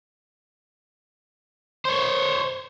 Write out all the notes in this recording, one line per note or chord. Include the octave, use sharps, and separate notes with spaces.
C5 C#5